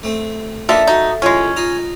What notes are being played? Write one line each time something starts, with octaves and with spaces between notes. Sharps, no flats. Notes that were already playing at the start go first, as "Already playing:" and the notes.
A3 C4
D3 A#3 D#4 F4 A4 E5
D#4 F#4
A1 G#3 C#4 F4
D#4 F4 D#5